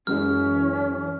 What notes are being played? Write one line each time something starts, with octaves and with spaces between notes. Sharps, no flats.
F#2 E3 F#3 G#3 C#4 F6